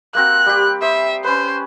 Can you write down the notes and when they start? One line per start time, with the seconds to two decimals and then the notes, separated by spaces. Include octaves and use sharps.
0.15 A#3 C4 F#4 F#6
0.46 G3 G4
0.82 C5 E5 D#6
1.24 C#4 B4 C5